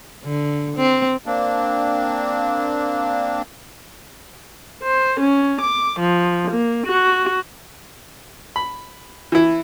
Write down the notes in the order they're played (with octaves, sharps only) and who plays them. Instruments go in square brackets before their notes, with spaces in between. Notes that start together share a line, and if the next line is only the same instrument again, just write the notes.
[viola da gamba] D3
C4
[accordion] A#3 C4 D4
[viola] C5
C#4
D6
F3
A#3
F#4
[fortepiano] B5
E3 E4